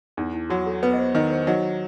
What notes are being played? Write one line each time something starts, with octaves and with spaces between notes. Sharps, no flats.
E2 D#4
E4
F#3 F#4
A4
B3 B4
D#5
C5
D#3 D#4 D#5
C5
F#3 D#4 D#5